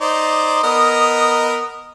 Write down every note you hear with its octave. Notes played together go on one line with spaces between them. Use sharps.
D#4 C5 D5 D#6
B3 A#4 D#5